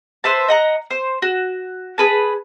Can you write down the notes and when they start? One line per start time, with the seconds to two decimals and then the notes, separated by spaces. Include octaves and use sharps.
0.24 B4 C5 E5 A5
0.48 D#5 F#5 A#5
0.91 C5
1.22 F#4
1.98 G#4 B4 A5